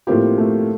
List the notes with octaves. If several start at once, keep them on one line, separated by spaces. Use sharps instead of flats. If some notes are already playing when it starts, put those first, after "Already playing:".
A2 F3 A#3 C4 G4
A3